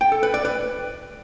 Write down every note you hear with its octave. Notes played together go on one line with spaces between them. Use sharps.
G5
A4
B4
D5
B4